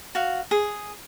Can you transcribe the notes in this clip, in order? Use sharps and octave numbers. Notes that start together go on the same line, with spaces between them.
F#4 F5
G#4